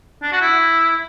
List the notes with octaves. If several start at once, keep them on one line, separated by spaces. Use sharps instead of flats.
D4
F#4
E4